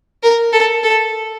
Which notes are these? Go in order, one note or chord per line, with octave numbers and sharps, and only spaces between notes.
A#4
A4
A4